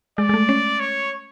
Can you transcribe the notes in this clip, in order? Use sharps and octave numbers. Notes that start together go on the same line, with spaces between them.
G#3 D5
G#3
A3
C#4
C#5